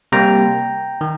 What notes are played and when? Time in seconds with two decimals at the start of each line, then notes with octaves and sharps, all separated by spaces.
0.12 C3 G3 A#3 G5 A#5
1.01 D#3